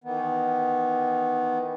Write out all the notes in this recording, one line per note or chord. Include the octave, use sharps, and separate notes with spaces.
D#3 E3 B3